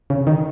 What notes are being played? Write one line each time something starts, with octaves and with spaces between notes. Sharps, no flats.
C#3
D#3